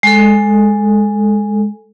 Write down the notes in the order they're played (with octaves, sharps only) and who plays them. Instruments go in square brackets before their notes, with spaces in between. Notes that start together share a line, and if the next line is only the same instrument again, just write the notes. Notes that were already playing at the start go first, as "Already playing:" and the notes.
[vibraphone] G#3 A4